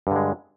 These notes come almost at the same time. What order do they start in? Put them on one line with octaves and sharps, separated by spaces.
G2 D3 G#3